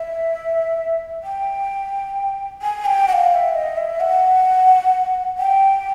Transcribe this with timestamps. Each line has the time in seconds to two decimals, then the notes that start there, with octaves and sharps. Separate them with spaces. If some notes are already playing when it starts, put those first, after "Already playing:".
Already playing: E5
1.23 G5
2.62 G#5
2.85 G5
3.08 F#5
3.13 F5
3.31 F5
3.35 E5
3.54 D#5
3.77 E5
4.00 F#5
5.38 G5